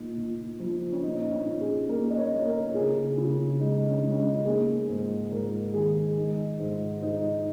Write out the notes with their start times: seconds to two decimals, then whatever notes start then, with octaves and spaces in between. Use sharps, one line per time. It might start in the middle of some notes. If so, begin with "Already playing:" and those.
Already playing: A#2 A#3 D#4
0.17 A#2
0.60 F3
0.92 C#4
1.03 A#2 D#4
1.31 C#4
1.46 A#2
1.61 G#4
1.89 A#3 A#4
2.10 D#5
2.18 C#5
2.31 A#3
2.46 A#4
2.74 C#3 G#4
3.18 C#3
3.59 G#3 D#4
3.89 C#4
4.02 G#3
4.11 C#4
4.17 D#4
4.45 A#3 G#4
4.88 G#2
5.31 G#2 A#4
5.74 D#3 G#4
6.17 G#3 D#4
6.59 G#2
7.02 G#2 D#4